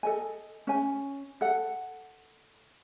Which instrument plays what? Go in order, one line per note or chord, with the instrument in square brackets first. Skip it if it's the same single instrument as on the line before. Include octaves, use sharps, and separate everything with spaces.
[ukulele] A4 D#5 G#5
C#4 G#5
A4 F#5